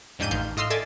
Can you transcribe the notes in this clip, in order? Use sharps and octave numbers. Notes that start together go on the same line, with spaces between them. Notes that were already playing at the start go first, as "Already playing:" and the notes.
F2 G#2 D4 G6 D#7
A1 D#3 F5 G6
A2 D#5 F5 C6 E6 C7
A4 D5 E5 G#5 A5